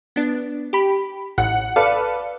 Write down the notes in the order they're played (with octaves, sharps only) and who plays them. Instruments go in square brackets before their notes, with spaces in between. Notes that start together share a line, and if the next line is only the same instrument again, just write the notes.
[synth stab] B3 D4
G4 B5
[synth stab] A1 [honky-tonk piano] F#5
[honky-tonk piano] A4 B4 [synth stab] D5 F5 C#7